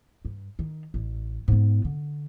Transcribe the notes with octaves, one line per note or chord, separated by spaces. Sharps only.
G2
D#3
A1
G#2 B3
D3